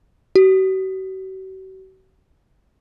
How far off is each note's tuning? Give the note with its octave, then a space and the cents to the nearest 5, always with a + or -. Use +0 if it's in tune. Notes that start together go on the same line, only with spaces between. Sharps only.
F#4 +45